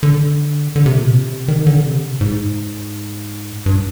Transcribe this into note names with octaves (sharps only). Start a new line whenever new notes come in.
D3
D3
C3
A#2
C3
D#3
D3
C3
G#2
G2